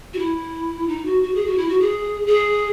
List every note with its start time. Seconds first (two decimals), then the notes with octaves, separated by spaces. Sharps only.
0.14 F#4
0.19 E4
0.88 D#4
1.05 F#4
1.23 F#4
1.34 G#4
1.46 F#4
1.57 E4
1.69 F#4
1.80 G#4
2.27 G#4